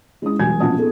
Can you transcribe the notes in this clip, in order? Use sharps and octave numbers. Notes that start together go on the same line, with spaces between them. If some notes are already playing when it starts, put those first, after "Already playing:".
G#3 C#4 E4 D#6
E1 F#3 G3 G#5 G#6
A#1 B2 C#4 F#5 A5 D#6
B3 D#4 G#4 A4